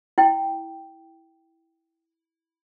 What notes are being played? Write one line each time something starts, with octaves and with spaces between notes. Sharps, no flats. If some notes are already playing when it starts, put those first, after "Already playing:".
E4 G5